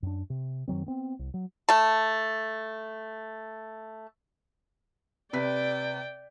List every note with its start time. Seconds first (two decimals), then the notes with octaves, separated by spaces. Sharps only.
0.02 F#2 D4
0.30 C3
0.68 F#2 D#3 F#3 C4
0.86 B3 C4
1.19 C2
1.34 F#3
1.69 A3 A5
5.33 C3 B4 D5 G5 B6